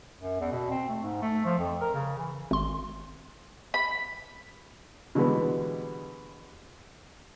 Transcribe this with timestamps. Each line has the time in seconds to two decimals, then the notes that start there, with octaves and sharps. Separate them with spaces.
0.21 F#2
0.40 E2
0.52 B2
0.70 C4
0.89 A3
1.03 G#2
1.22 A3
1.45 F3
1.59 F2
1.81 A#4
1.94 C#3
2.18 E3
2.51 G#1 C6
3.74 B5
5.15 B2 D3 E3 G3 G#3 B3